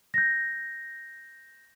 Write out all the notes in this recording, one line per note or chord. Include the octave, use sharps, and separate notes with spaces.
G6 A#6